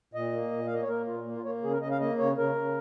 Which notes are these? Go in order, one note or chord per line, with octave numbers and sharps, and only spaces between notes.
A#2 D#5
A#3
A#2
F5
A#3 D#5
C#5
A#3 A#4
A#2 F4
A#3
F4
A#3 C#5
C#3 G#4
A#4
C#3 D#5
F5
A#3 D#5
C#3 C#5
C#3 A#4
C#3